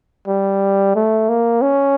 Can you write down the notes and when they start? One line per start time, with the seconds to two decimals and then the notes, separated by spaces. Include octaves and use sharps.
0.27 G3
0.95 A3
1.29 A#3
1.62 C#4